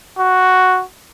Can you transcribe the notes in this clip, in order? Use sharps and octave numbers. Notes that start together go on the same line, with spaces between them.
F#4